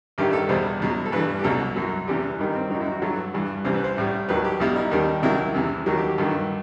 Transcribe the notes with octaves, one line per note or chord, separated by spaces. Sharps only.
A1 G2 D#3 G3 G4
A4
E2 B2 G3 C5
E2 B2 F#3
A4
G2 E3 G3 B4
G4
C2 B2 F#3 A4
F#2 F#3
E2 C3 E3 G3 G4
G2 D#3 G3 D#4
C4
F#2 D#3 F#3 D#4
E4
F#4
G2 F#3 A4
G2 E3 G3
C2 C3 E3 G3 C5
B4
C5
A1 A2 G3
D#2 D#3 F#3 B4
G4
B1 B2 G3 E4
D#4
D#2 D#3 G3
C2 C3 D#3 F#3 E4
E2 C3 E3
D#2 D#3 F#3 F#4
G4
G4
G2 D#3 F#3 A4